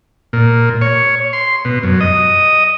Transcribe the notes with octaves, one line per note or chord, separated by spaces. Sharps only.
A#2
C#5
C6
B2
F#2
D#5